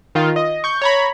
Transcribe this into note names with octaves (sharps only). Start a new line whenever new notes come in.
D#3 F4
D#5
C#6 G6
C#5 A#5 B5